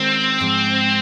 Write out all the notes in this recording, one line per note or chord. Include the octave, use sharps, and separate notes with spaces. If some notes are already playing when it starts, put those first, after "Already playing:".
Already playing: D#3 G#3 C4 C#4 F#4 A#4
G#2 F3 G#3